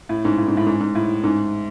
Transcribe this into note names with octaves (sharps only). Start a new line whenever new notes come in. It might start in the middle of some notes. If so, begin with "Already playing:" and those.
A2
G#2
A2
G#2
A2
G#2
G#2
A2
G#2